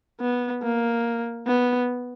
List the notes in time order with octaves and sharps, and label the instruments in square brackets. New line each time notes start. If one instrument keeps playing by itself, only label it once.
[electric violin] B3
A#3
B3